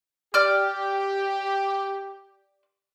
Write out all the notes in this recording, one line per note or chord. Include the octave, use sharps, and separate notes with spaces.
G4 D5 F6